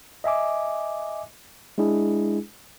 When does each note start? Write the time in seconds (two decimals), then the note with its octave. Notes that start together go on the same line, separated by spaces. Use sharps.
0.24 D#5 E5 G#5 D6
1.78 G#3 D4 E4 G#4